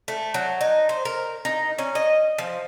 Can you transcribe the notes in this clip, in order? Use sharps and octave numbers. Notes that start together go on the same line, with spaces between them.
A3
F#3
D#4
C5
A#4
D#4
C#4
D#5
F3